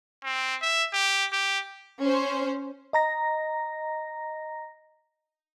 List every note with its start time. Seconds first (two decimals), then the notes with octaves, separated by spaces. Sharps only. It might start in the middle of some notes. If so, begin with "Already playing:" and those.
0.24 C4
0.62 E5
0.93 G4
1.32 G4
2.02 C#4 C5
2.93 D#5 A#5 A#6